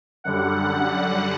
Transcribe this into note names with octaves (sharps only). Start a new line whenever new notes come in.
F#2 D3 G3 F#5